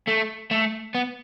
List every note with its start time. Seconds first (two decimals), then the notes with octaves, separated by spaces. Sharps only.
0.07 A3
0.51 A3
0.94 B3